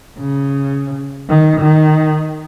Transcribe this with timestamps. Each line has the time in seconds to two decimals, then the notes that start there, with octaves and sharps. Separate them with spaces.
0.20 C#3
1.29 D#3
1.61 D#3